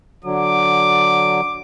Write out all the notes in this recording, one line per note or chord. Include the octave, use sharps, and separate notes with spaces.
D3 F#3 D6